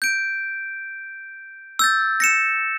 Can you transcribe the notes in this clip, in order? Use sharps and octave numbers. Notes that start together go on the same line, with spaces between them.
G6 D7
E6 G6 A6
A#6 C#7 E7